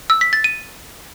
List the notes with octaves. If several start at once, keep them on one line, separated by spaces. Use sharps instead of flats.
E6
B6
A6
D#7